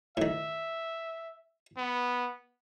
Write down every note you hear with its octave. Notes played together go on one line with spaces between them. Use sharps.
A2 D#3 E5
B3